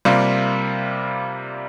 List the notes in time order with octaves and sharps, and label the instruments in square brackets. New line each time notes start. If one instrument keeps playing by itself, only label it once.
[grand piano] C3 G3 A#3 F4